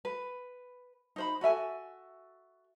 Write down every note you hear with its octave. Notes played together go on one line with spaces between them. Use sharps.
B4
D#4 C5 B5
F#4 A4 E5 G#5